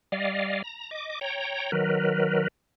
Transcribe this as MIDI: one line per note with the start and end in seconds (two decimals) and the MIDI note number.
0.12 0.62 55
0.12 0.62 74
0.12 0.62 75
0.12 0.62 77
0.64 0.90 82
0.91 1.19 75
0.91 1.19 86
1.21 1.71 73
1.21 1.71 79
1.21 1.71 82
1.72 2.48 51
1.72 2.48 54
1.72 2.48 70
1.72 2.48 71